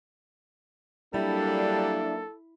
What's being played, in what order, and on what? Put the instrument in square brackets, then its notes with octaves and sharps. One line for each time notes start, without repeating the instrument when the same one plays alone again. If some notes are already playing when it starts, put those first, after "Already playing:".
[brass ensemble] F#3 A#3 D4 [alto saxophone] G3 [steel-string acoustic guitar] E4 [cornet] A4